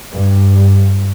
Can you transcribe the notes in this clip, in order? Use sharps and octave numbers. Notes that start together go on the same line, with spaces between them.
G2